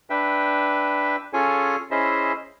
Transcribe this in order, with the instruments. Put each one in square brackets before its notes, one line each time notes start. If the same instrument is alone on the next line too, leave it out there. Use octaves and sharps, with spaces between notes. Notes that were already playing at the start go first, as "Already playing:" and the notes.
[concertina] D4 B4 E5 G5
C#4 F4 G#4 A4 C#5 G#5
C#4 E4 G#4 C5 D#5 E5